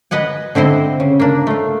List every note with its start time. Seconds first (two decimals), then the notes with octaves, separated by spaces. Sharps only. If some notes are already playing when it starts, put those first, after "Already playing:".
0.11 B4 D#5 F#5 G#5
0.55 D3 C4 E4 C5 D#5
1.00 C#3
1.20 A#3 D4
1.47 A3 F4